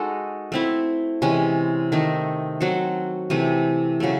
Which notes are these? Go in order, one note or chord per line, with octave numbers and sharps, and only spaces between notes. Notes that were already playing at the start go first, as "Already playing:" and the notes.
Already playing: G#3 D#4 F#4 A4
A3 C4 E4
C3 E3 G#3 C#4
D#3 A3 D#4
F#3 C4 F#4 A4
C3 E3 A3
C#3 F#3 A3